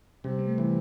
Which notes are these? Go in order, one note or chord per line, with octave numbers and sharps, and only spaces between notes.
C3 G3
B3
A3
E3 G3